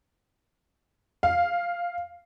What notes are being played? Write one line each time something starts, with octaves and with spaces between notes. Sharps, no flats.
F5